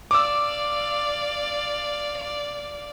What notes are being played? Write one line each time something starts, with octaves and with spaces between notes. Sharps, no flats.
D5 F5 D6 E6